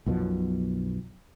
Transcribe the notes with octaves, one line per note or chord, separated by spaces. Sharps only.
B1 F#2 B2 F3